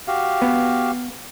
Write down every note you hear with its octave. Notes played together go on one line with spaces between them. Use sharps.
F#4 G4 F5
B3